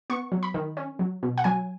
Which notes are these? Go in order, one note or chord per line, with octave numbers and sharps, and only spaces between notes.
B3 C#6
F#3
B5
D#3
C#4
F#3
B2
F#5
F#3 G#5